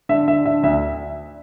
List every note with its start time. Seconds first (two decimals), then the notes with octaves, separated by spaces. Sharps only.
0.09 D3 E5
0.28 D3 E5
0.45 D3 E5
0.63 D2 E5